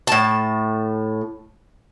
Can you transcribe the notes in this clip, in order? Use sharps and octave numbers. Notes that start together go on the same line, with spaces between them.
A2 A5